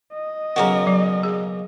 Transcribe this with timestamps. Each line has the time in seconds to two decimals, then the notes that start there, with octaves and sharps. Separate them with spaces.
0.13 D#5
0.56 B1 C#3 A#3 F#4 G4 A#4
0.87 F#3
1.23 G#4